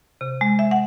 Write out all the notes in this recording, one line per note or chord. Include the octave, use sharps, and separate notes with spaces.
C3
G#3
E5
F#5